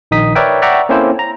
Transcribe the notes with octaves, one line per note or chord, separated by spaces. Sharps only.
A#1 D#3 D#4 D#6 B6
A#4 B4 C#5 D5 E5 G5
D5 E5 F#5 G5 A#5 C#6
A#3 C4 C#4 E4 A4 C5
A#5